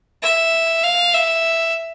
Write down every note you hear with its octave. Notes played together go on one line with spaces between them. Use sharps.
E5
F5
E5